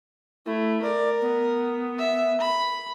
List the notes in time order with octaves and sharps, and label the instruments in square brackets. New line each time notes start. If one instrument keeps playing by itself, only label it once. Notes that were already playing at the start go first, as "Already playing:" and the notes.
[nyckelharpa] A3 [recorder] E4
[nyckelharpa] A#4 [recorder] D5
[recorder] B3
[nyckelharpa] E5
B5